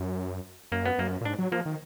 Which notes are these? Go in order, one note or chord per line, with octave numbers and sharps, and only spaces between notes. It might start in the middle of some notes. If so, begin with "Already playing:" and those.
Already playing: F#2
F#2 A#3
B3
F#2 A#3
A#2
G#2 D4
F#3
F3 A#3
D#3